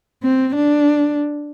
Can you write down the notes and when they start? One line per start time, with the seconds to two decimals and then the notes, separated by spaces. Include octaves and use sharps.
0.23 C4
0.55 D4